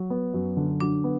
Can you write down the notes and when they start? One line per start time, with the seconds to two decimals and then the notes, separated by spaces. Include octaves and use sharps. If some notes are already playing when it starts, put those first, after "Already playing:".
Already playing: F#3
0.10 B3
0.34 F#2
0.57 D3
0.80 F#3 D4
1.04 B3